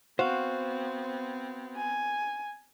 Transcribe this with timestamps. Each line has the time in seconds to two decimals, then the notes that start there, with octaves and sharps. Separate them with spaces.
0.19 B3 C4 F#4 C5 F5
1.77 G#5